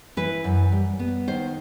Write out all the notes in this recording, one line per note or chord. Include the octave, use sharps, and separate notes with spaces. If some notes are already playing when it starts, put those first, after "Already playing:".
E3 B4
F#2
G3
B3
D#3 C5